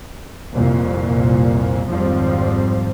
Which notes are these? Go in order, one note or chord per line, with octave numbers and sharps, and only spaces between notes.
C2 F2 A#2
G#1 F2 F3 G3 C4